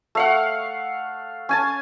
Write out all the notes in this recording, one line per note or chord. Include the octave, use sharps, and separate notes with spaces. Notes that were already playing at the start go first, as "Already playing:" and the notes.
A3 F5 F#5
C#4 G#5 A5